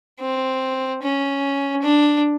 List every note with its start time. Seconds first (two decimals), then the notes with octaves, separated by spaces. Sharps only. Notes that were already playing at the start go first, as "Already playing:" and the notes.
0.20 C4
1.02 C#4
1.82 D4